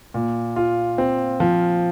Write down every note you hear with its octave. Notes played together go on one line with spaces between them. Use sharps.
A#2
F4
C4
F3